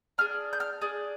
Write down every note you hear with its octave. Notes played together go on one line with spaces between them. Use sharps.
D4 G#4 F6
G6
F6
D4 G#4